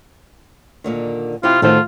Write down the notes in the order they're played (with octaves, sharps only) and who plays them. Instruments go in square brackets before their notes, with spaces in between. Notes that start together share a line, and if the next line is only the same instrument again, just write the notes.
[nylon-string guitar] A#2 D3 D#3
[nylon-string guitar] C3 E4 G4 [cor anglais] F4
[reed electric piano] A2 D#3 C5 [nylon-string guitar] A3 F#4 A4 [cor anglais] F4